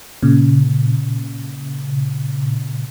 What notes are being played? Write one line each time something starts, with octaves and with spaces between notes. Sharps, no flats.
A#2 C#3